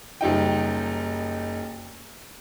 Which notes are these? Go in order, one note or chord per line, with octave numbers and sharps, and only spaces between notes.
F#1 G3 D#4 G5